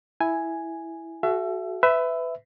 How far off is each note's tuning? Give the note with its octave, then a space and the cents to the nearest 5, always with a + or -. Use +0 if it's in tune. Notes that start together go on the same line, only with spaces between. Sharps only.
E4 +0 G#5 +0
F#4 +0 A4 -45 E5 +30
B4 +25 E5 +0